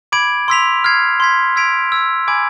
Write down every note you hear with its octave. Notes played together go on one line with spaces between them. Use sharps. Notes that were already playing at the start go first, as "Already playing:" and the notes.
B5 D6 G#6 D7
C6 E6 B6 F7
F6 G#6 C7
C6 G#6 B6
E6 G#6 B6 D7 F7
E6 G#6 B6 D7
G#5 B5 D6 G#6 D7